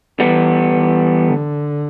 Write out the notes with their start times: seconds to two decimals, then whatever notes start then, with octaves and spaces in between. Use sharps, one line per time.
0.20 E3 G3 B3
0.75 E3
1.29 D3